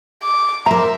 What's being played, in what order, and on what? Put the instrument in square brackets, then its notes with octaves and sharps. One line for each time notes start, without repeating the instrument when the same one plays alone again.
[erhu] D6
[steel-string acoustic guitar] A#4 C5 [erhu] E5 [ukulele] A#5